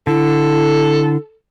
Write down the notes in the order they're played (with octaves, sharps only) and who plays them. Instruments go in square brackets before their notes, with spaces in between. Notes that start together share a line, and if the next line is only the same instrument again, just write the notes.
[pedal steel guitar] D3 [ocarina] E4 [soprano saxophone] A4